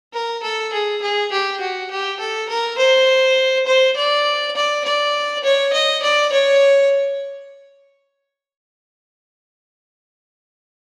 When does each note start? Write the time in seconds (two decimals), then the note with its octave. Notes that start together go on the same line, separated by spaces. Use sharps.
0.13 A#4
0.43 A4
0.72 G#4
1.02 G#4
1.32 G4
1.60 F#4
1.91 G4
2.20 A4
2.49 A#4
2.78 C5
3.67 C5
3.97 D5
4.56 D5
4.85 D5
5.44 C#5
5.73 D#5
6.03 D5
6.32 C#5